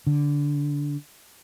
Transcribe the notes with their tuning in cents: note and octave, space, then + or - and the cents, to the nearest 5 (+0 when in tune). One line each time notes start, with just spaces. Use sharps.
D3 -15